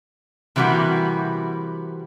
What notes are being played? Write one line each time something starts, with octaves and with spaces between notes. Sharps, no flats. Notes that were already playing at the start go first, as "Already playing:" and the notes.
C3 E3 G3 A#3 F#4